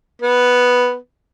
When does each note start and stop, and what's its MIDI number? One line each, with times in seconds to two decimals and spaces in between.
0.22 0.96 59